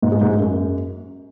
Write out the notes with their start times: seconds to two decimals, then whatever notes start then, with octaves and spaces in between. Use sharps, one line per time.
0.02 G#2
0.12 G#3
0.21 G#2
0.30 G#3
0.40 F#2